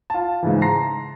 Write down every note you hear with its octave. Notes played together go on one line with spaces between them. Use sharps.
F4 A5
G#2 C#3 E3
A5 A#5 C6 A#6 C7